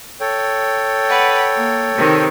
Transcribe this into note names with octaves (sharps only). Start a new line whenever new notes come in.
A4 C#5 G5
B4 D5 F#5
A#3
C3 D#3